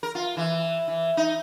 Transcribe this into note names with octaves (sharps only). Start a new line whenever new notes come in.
A#4
F4
E3
E3
D#4